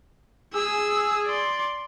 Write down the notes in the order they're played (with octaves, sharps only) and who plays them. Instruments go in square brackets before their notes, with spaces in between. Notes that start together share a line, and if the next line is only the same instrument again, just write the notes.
[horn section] G#4 [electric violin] E6
[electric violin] D5 C6